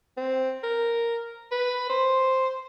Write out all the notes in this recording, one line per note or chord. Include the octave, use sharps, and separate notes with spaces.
C4
A#4
B4
C5